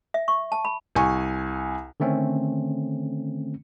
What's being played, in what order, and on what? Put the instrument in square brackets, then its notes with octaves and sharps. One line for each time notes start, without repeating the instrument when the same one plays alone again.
[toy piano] E5
C#6
A5
B5
[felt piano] C2 G#5 C#6
[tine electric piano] D3 D#3 A3 C4 C#4